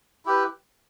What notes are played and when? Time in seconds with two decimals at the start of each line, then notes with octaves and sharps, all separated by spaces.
0.25 E4 G4 B4